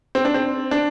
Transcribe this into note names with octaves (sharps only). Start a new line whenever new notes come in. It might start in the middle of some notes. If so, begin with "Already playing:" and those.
C4
D4
C4
D4